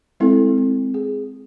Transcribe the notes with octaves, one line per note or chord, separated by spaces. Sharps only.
G#3 C4 E4 A4
C4
G#4